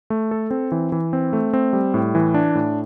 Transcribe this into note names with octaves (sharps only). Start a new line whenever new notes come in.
A3
A4
C4
E3
E3
C4
A3
C4
G3
A2
E3
D4
A2